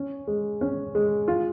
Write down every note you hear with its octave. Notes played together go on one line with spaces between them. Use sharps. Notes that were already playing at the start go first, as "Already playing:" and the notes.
Already playing: C#4
G#3
C#4
G#3
F4